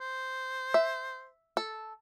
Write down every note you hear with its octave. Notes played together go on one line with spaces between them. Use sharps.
C5
E5
A4